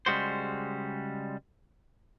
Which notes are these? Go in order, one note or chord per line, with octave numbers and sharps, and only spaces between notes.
C#3 G3 G#3 F#4 C5